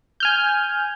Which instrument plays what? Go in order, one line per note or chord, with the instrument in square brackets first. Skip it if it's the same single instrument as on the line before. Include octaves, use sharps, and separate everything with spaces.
[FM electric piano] G#5 F6 G6